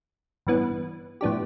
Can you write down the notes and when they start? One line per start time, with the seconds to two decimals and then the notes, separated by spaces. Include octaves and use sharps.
0.47 A1 G2 E3 B3
1.21 A2 F3 B3 D4 G4